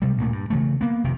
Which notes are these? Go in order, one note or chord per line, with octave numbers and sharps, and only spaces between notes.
C3 G3
D2 A#2 A3
G2
C#3 E3 A3
A#3 B3
F1 C3 D#3